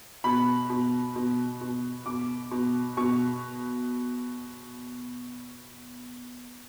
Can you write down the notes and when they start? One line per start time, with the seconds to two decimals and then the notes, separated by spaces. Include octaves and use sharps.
0.24 B2 B5
0.70 B2
1.16 B2
1.61 B2
2.06 B2 D6
2.51 B2
2.97 B2 C#6